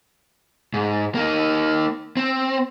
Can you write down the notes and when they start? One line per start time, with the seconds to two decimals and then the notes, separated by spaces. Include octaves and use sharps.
0.74 G#2
1.15 A#3 D#4
2.17 C4